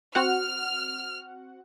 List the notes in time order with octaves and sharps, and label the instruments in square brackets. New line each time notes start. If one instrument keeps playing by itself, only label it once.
[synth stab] C4 F#4 F#5 [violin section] F6